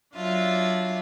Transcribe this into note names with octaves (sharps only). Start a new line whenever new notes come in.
F#3 D4 F4 E5